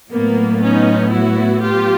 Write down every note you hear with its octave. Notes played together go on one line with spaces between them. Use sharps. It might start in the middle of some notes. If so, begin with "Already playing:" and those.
A2 F#3 A#3 B3
C#4 D#4
E4 F#4
F4 G4